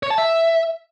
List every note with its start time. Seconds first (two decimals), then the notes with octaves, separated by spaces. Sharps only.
0.03 C#5
0.10 A5
0.18 E5